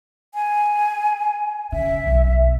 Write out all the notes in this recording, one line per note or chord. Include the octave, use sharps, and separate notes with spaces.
G#5
C#3 E5
B1